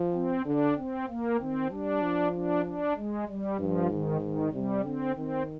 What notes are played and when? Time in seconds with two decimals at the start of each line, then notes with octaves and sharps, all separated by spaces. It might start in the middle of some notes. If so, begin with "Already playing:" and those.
Already playing: F3
0.14 C4
0.46 D3 D4
0.77 C4
1.08 A#3
1.39 D#3 C4
1.71 G3 D4
2.02 F3
2.34 D4
2.65 D4
2.96 G#3
3.28 G3
3.59 G2 F3
3.90 G#2 D#3
4.21 D#3
4.53 C3 G3
4.84 D3 C4
5.16 D#3 C4